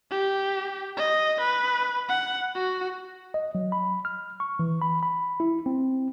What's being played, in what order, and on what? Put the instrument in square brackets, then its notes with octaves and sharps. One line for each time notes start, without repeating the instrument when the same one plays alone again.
[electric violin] G4
D#5
B4
F#5
F#4
[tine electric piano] D#5
F#3
B5
F6
C#6
E3
B5
B5
E4
C4